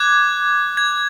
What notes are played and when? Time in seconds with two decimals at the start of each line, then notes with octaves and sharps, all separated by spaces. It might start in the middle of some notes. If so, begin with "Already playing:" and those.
Already playing: D6 F#6 G#6
0.77 G#6